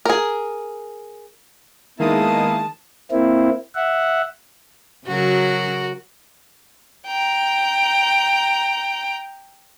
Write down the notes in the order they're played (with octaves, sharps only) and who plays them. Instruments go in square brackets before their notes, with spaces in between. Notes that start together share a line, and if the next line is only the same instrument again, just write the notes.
[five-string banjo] G#4 A#4
[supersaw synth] D#3 G#3 D#6 [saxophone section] A#3 B3 E4 [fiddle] A5
[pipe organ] A#3 C4 E4
E5 F#5
[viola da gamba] C#3 F#3 [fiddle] F#4 A#4
[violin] G5 A#5